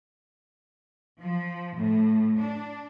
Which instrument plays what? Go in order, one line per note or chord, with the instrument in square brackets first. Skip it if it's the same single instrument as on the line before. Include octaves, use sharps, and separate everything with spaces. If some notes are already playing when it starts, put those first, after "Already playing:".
[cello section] F3
A2
D4